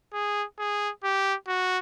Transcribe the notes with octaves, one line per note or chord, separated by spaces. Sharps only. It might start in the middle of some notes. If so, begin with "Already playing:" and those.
G#4
G#4
G4
F#4